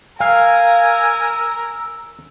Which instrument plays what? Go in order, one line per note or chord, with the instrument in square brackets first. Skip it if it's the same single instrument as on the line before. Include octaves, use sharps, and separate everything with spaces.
[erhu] A#4 [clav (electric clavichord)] F5 [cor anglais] G#5 [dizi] E6